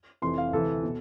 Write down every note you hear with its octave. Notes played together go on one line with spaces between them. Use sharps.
F1 F2 C3 E3 C6
F5
D2 C3 E3 A4
B2